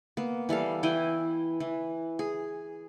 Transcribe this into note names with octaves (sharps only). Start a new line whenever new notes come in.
A#3 B3
E3 G3 A4 F5
E3 E4 G5 G#5
E3
G#4